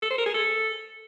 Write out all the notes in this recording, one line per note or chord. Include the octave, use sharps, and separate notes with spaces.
A4
C5
A#4
G#4
A4